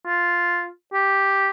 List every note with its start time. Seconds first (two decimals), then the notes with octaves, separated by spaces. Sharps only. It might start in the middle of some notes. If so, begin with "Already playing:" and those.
0.06 F4
0.93 G4